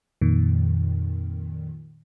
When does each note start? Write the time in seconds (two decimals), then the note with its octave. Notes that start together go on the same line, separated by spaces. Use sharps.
0.22 F2 A#2 D#3